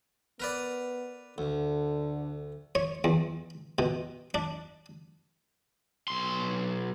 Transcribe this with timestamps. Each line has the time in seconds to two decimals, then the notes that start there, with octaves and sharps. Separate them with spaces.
0.40 B3 A#4 B4 D5
1.38 D2 D3
2.75 C#5
3.04 E2
3.79 B2
4.34 D4
6.08 B1 C6